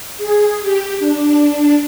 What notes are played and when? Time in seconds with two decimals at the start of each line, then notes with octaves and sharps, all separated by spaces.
0.17 G#4
0.61 G4
0.99 D4